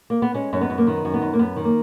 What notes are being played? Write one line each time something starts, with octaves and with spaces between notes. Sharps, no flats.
A#3
B3
G#3 C#4
F#2 C#4
B3
F#2
A#3
D#3 B3
F#2
B3
F#2
A#3
F#2 B3
D#3
A#3